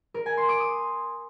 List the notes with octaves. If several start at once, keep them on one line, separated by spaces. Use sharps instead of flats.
A#4
G#5
C6
D6
D#6